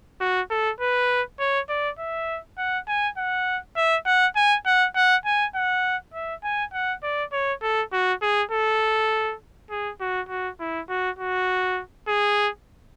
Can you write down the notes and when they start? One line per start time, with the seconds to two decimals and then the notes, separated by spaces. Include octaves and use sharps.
0.21 F#4
0.50 A4
0.81 B4
1.39 C#5
1.69 D5
1.99 E5
2.58 F#5
2.88 G#5
3.17 F#5
3.76 E5
4.06 F#5
4.36 G#5
4.66 F#5
4.95 F#5
5.25 G#5
5.55 F#5
6.14 E5
6.44 G#5
6.74 F#5
7.03 D5
7.32 C#5
7.62 A4
7.93 F#4
8.22 G#4
8.52 A4
9.71 G#4
10.00 F#4
10.29 F#4
10.60 E4
10.89 F#4
11.19 F#4
12.08 G#4